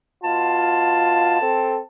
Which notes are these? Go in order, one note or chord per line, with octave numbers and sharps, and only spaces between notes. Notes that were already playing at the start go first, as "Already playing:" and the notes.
B2 F4 A5
C4 A4